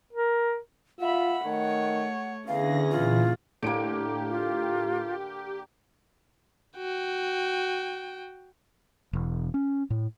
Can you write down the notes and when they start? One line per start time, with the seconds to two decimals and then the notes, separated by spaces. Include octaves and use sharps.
0.13 A#4
1.00 F4 E5 F#5 B5
1.46 D#3 A3 C#5
2.48 E2 D3 C#4 G#4 F5 A#6
2.91 A#2 E3 F4
3.63 A2 D3 A#3 G4 D7
4.30 F4
6.77 F#4 G5
9.13 E1
9.54 C#4
9.90 A2